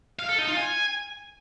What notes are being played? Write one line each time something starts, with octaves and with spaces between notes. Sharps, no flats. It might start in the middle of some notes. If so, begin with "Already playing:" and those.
F5
A4
D#4
F4
G#5